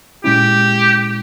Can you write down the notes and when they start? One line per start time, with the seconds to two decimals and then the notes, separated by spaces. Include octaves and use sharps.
0.24 A#2 G#3 C#4 E4 G4